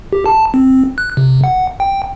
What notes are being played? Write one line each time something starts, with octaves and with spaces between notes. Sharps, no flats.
G4
A5
C4
F#6
C3
F#5
G5